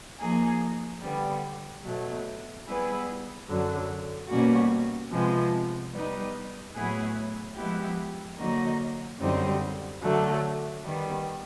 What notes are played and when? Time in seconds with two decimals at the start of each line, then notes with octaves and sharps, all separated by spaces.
0.20 F3 A#3 D#4 G#4
1.02 D3 G3 B3
1.84 B2 F#3 A3
2.66 G3 B3 E4 G#4 B4
3.47 F#2 D3 F#3
4.28 B2 G3 A#3 C#4 F#4
5.11 C3 F3 G#3 B3
5.92 G3 B3 D#4
6.74 A2 F#3 B3 E4 G#4
7.56 F3 G#3 B3 E4 G4
8.38 D3 F#3 A#3 D#4 F#4
9.19 F#2 D3 G3 C4 D#4
10.02 D3 F#3 A3
10.84 D#3 G3 B3